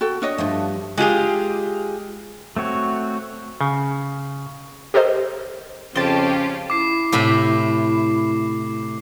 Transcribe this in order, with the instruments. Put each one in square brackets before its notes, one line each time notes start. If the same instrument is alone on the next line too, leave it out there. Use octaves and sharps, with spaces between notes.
[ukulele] F#4 A4 G5
D4 C#5 D#5
[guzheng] G2 F3 A3
[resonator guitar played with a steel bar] G#3 F4 G4 G#4
[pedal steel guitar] A3 C4 F#4 C#5
[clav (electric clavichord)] C#3
[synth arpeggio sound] G4 A4 A#4 C5 D#5
[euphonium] F2 [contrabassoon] C#3 [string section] C#4 F4 G4 [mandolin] C5 A5
[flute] E4 [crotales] D6 C7
[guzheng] A2 C3 B5